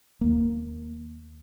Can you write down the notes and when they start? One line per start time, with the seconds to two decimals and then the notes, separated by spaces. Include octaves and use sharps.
0.21 D#2 A#3